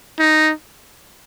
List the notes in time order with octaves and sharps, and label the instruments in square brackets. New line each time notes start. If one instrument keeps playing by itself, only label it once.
[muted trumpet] D#4